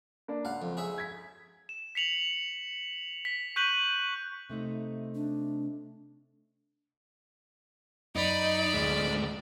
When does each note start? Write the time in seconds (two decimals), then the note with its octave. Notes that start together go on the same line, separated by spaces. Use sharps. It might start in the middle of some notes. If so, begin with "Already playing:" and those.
0.28 A#3 D4
0.45 C#2 F5 F#5
0.62 F2
0.77 G#4 C#5 E5
0.98 G#6 B6
1.69 E7
1.95 B6 C#7 F7 F#7
3.25 B6
3.56 C#6 F#6 G6 B6 D#7 F#7
4.50 C3 A3 D#4
5.15 D4
8.16 F#2 D#4 D5 B5
8.74 D1 D2 G#3